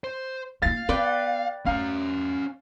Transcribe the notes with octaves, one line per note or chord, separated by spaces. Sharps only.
C5
A#3 F4 F5 A6
B3 B4 D5 G5
E2 A3 C#4 F5 A#5